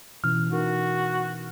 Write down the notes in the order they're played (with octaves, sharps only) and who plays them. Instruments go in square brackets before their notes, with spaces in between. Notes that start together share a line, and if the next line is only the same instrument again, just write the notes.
[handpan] B2 E3 C#4 [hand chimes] F6
[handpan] D#4 A#4 [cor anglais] F#4